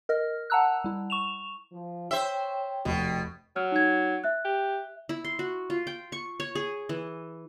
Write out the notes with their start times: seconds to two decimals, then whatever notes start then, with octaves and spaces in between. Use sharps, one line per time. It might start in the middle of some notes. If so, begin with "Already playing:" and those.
0.09 A#4 D#5 F6
0.50 F#5 A5 A#5 E6 F#6
0.84 G3 E4
1.10 C#6 E7 F7
1.72 F3
2.11 C5 C#5 E5 G5
2.85 F1 B2
3.56 F#3 F6
3.72 D#4 G#6
4.24 E5 F#6
4.45 G4
5.09 E4
5.24 C6
5.39 F#4
5.70 F4
5.87 G5
6.12 C#6
6.40 C#5
6.55 G#4
6.89 E3